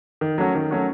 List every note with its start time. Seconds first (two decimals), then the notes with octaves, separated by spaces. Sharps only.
0.21 D#3
0.38 F#3 A3 C#4 F#4
0.55 D#3
0.71 F#3 A3 C#4 F#4